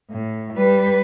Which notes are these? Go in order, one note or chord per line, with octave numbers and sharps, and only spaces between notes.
A2
G3 B4